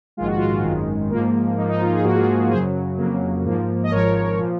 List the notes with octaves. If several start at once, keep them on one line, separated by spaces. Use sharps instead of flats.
A#1 G#2 D#3 G#3 F4
F#4
F4
G#1 F#2 D#3 G#3
G#2 F3 A#3
G#2 F3 A#3 D#4
D#4
F4
G#4
G#2 F3 A#3 F#4
F4 G#4
F#2 C#3 F#3 G#4 C5
F2 C#3 F#3 A#3
G#2 F3 A#3
D#5
G#1 G#2 F3 A#4 C#5
A#2 F3